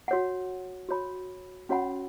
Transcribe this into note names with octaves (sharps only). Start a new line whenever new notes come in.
F#4 C#5 F#5
F#4 C#5 B5
C#4 F#4 C#5 F#5 B5